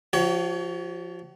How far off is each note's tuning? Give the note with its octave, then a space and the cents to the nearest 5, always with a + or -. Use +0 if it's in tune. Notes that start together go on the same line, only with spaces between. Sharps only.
F3 +0 F#4 +45 C#5 +30